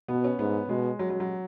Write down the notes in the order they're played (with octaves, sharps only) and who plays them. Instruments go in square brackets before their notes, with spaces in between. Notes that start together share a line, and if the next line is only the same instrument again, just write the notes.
[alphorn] B2 [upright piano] B3
[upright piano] C#4
[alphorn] G#2 [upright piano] B3
[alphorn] B2 [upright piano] G#3
[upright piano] F#3
F#3
F#3